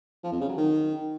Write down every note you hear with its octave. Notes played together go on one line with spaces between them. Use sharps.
F3
F2
C#3
F#3
D#3